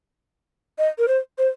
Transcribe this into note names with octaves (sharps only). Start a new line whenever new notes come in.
D#5
A#4
C5
C5